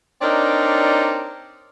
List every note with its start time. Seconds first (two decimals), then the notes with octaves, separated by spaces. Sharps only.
0.22 C4 D4 D#4 A#4 C#5 D5